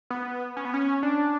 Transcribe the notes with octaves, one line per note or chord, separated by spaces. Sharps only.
B3
C#4
B3
C#4
D4